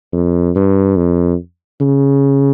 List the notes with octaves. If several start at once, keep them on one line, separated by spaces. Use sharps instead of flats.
F2
G2
F2
C#3